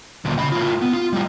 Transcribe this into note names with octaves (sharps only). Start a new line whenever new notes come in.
D2 A#2
C#3 B5
A2 F4
B3
F4
A2 G3